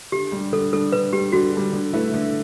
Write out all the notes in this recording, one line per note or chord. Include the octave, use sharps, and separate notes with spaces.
D3 G4
G3 D4
D3 A4
G3 D4 A4
D3 B4
G3 D4 G4
D3 F#4
G3 D4
D3
A3 E4 B4
D3